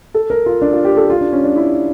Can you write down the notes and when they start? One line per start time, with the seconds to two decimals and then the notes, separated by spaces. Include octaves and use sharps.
0.14 A4
0.30 A#4
0.46 F4
0.62 D4
0.73 F4
0.85 G4
0.97 A4
1.10 F4
1.21 D4
1.33 C#4
1.44 D4
1.56 E4